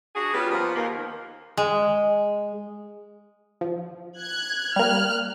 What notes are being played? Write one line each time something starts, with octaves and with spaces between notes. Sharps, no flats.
D4 F#4 G#4
G3 B3 C#4 F4
F3 A#3 B3
D#2 A#3
G#3
F3
F#6 G#6
G3 A#3 F6 F#6